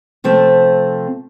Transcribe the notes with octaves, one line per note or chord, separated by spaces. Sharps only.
C3 F3 A3 C4